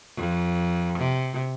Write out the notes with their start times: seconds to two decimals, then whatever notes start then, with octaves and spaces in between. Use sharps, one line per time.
0.16 F2
0.99 C3